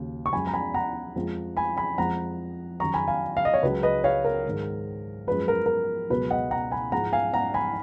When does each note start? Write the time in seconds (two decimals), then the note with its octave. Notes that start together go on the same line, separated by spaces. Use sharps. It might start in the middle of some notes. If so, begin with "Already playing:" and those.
Already playing: D#2 C#3 F#3
0.26 C#6
0.33 F#2 F3 G#3 G#5 B5
0.47 A#5
0.54 G#5 B5
0.74 F#5 A#5
1.16 F2 F3 G#3
1.57 G#5 B5
1.77 G#5 B5
1.98 F2 F3 G#3 F#5 A#5
2.80 F#2 D#3 F#3 A#5 C#6
2.94 G#5 B5
3.08 F5 G#5
3.37 F5
3.45 D#5
3.54 C#5
3.63 C#2 C#3 F#3 B4
3.83 B4 D#5
4.04 C#5 F5
4.24 A#4
4.45 G#2 D#3 G#3
5.27 F#2 F3 G#3 B4
5.48 A#4
5.66 A#4
6.10 C#2 B2 F#3 B4
6.30 D#5 F#5
6.51 F#5 A#5
6.72 G#5 B5
6.92 G#2 F3 G#3 F#5 A#5
7.13 F5 G#5
7.34 F#5 A#5
7.54 G#5 B5